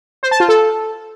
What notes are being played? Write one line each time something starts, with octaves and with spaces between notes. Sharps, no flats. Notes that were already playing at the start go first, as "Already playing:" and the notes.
C5
A5
F4
A4